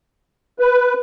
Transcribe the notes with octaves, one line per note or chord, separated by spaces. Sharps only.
B4